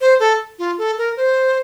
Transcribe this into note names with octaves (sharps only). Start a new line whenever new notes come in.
C5
A4
F4
A4
A#4
C5